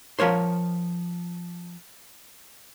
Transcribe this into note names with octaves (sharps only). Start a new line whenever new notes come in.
F3 A#4 C#5 C6